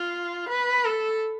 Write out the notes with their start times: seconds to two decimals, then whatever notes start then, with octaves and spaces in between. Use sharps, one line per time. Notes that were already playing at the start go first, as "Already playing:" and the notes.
Already playing: F4
0.49 B4
0.85 A4